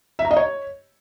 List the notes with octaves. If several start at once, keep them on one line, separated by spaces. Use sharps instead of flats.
E5
A#5
D#5
C#5